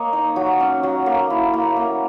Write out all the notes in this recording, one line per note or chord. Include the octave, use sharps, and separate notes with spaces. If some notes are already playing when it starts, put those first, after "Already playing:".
Already playing: A#3 C#5 D#5
D#4
F#3
C#4
F#3
A#3
E4
A#3
A#3